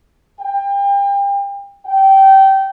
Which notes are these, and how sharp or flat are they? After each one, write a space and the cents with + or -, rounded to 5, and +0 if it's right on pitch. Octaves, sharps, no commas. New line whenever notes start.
G5 +35
G5 -20